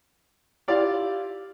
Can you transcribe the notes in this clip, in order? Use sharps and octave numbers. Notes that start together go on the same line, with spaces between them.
E4 F4 G4 D5 F5